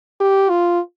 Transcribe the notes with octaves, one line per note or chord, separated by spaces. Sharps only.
G4
F4